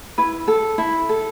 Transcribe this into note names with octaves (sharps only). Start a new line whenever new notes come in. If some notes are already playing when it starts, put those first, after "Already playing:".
E4 B4
A4
E4
A4